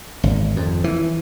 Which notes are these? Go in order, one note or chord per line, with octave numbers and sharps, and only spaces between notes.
G#1
F2
E3